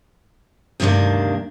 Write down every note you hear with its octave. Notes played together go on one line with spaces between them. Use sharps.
D2 G2 C3 D#3 A#3 D4